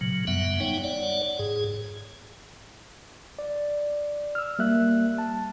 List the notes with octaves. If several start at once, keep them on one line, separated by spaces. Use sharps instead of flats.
A#2 C#3 F#3
F#2 G3 B3 E5 F#5
G3 B3 D#4 C#5 G5
C#5 D5 F#5
G#2 G#4
D5
E6 F6
G3 A#3 E5 F#6
A5